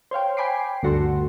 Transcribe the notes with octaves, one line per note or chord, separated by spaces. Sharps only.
C5 C#5 F5 G5
G5 G#5 B5 D6 C7
D2 G2 F#4 A4 C6